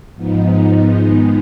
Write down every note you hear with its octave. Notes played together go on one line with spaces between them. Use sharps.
G#2 F3 B3 D#4
D#3 G#3 B3 D#4